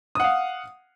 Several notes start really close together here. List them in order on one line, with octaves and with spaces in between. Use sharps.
D#6 F#5 F5